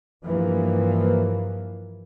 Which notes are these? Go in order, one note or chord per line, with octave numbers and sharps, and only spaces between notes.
G2 E3 F3 A#3